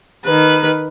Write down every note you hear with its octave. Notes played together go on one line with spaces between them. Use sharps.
D#3 B4